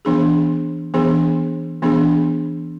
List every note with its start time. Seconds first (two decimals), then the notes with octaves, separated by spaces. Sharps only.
0.05 E3 B3 D4 G#4
0.94 E3 B3 D4 G#4
1.82 E3 B3 D4 G#4